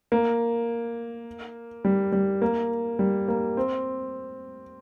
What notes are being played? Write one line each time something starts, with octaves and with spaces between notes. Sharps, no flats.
A#3
G3
G3
A#3
G3
A#3
C4